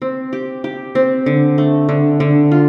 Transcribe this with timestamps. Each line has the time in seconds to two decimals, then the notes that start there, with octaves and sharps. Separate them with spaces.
0.02 C4
0.33 G4
0.64 G4
0.95 C4
1.26 D3
1.58 A3
1.89 D3
2.20 D3
2.51 F4